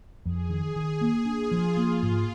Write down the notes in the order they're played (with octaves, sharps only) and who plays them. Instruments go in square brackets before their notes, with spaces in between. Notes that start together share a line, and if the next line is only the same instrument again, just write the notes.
[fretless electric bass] F2 [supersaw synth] G#4
[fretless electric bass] D#3
D#3
[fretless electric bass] A#3 [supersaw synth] G#4
[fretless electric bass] D4
[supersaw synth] F4
[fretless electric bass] F3
[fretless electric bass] A#3 [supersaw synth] F4
[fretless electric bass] G#2